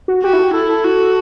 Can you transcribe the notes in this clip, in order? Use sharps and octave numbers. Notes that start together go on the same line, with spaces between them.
F#4
F#4 G4
E4
A4
G4
E4 A4
A4
F#4